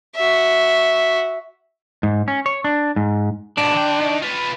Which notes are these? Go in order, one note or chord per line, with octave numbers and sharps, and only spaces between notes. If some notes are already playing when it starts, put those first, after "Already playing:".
F#4 E5
G#2
C#4
C#5
D4
G#2
G#2 B2 D4
D3 G5
D#3
F4 B4